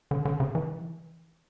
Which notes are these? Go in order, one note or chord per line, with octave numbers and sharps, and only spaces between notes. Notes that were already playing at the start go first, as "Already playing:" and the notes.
D3
D3
C#3
E3